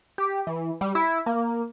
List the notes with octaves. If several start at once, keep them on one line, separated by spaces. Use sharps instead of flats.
G4
E3
G3
E4
A#3